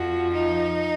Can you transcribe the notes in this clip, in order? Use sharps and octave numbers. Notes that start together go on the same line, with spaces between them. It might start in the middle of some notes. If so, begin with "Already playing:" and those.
Already playing: F2 F3 F#4
D#4